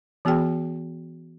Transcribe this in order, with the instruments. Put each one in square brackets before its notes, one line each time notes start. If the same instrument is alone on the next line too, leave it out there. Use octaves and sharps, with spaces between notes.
[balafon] E3 B3 F#4 G#4 G5